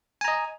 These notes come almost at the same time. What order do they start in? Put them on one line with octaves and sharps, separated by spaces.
G#5 A#5 D#5